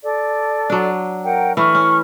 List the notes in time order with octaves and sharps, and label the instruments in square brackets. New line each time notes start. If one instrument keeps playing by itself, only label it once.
[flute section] A4 D5
[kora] F#3 D4
[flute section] A#4 F#5 G5
[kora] E3 A3 [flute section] B5 C#6 F6
[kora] C#4